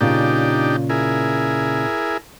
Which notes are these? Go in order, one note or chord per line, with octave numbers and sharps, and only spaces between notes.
A#2 C#3 D4 D#4 F4 G4
E4 G#4 A#4